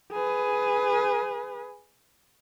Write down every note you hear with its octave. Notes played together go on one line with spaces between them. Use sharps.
G#4 B4